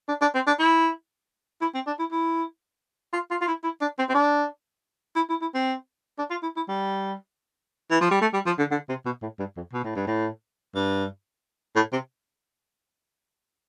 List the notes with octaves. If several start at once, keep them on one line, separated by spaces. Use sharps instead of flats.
D4
D4
C4
D4
E4
E4
C4
D4
E4
E4
F4
F4
F4
E4
E4
D4
C4
C4
D4
E4
E4
E4
C4
D4
F4
E4
E4
G3
E3
F3
G3
A3
G3
F3
D3
D3
C3
B2
A2
G2
F2
B2
A2
G2
A2
G2
A2
C3